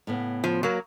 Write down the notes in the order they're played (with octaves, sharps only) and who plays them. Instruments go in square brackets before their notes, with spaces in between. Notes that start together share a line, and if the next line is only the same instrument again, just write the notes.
[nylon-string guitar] A2 C#3 B3
[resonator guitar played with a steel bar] F3
F#3 A#3